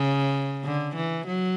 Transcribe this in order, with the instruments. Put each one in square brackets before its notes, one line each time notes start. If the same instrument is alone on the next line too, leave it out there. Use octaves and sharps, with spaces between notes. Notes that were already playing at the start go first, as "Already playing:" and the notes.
Already playing: [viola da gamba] C#3
D3
E3
F#3